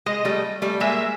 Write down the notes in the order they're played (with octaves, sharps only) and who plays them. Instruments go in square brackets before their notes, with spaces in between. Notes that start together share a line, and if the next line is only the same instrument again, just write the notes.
[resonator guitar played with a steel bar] G#3 [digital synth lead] D#5
[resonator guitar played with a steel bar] G3 A3
G3 A3
[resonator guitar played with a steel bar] G#3 A#3 [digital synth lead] E5